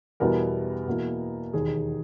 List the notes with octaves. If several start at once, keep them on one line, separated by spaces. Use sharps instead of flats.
E2 B2 G3 B3 E4 A#4
E2 B2 A#3 E4
E1 D#2 D#3 G#4